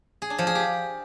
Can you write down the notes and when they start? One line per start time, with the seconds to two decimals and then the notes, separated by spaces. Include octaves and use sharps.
0.22 G#4
0.30 D4
0.38 F3
0.47 G#4
0.55 G4